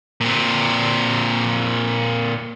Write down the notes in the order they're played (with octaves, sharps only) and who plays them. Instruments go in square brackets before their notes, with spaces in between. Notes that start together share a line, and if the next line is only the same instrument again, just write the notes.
[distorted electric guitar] A#2 C4